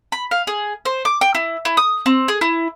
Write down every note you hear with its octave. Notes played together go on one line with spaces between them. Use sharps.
B5
F5
G#4
C5
D6
G5
E4
E4
D#6
C4
G#4
E4